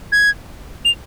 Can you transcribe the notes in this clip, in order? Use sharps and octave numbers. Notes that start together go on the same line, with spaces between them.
G#6
F7